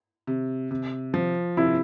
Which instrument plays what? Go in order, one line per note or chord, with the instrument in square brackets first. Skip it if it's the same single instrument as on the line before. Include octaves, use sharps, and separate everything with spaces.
[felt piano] C3
C3
F3
[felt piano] C3 [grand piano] E4